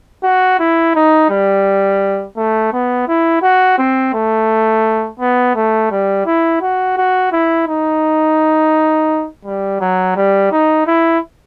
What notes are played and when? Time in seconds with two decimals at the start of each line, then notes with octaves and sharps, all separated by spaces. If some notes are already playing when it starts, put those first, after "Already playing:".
0.23 F#4
0.59 E4
0.95 D#4
1.30 G3
2.36 A3
2.72 B3
3.08 E4
3.42 F#4
3.78 C4
4.14 A3
5.19 B3
5.55 A3
5.91 G3
6.26 E4
6.62 F#4
6.97 F#4
7.32 E4
7.68 D#4
9.45 G3
9.80 F#3
10.16 G3
10.51 D#4
10.87 E4